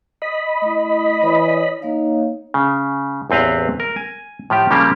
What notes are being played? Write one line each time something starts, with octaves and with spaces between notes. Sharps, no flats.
D#5 B5
A3 E4
E3 C#5 D5
A#3 D#4 C#5 F5
C#3
A1 E2 C4 B4 F5
A#4
G#5
A2 F3 G4
C#3 F3 G3 A#3 G4